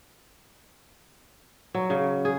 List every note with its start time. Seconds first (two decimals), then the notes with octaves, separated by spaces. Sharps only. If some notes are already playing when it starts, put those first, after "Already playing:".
1.75 F#3
1.90 C#3
2.25 G#4